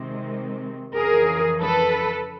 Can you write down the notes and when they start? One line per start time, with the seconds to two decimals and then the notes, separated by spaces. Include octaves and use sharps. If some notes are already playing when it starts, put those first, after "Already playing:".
Already playing: C3 D#3 G#3 C4
0.96 F2 C#3 E3 G#4 A#4
1.60 A4 B4